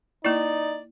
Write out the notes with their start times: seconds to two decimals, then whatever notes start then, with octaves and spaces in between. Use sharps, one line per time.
0.25 A#3 D#4 E4 D5